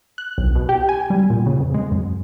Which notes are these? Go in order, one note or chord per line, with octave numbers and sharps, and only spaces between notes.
F#6
B1
B2
G4
G#5
G3
A#2
C#3
F2
G#3
F#2